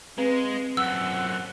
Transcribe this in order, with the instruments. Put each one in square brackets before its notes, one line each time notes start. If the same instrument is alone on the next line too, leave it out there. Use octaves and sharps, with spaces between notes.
[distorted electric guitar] G#3 [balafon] C4 B4 F5
[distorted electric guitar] F#2 F3 [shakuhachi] F#5 [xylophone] E6